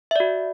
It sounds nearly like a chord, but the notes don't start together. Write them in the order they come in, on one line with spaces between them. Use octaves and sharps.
E5 D5 F#4